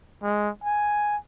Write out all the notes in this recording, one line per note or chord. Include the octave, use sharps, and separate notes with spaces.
G#3
G#5